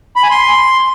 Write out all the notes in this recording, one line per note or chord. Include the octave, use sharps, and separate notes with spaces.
B5
G#5
C6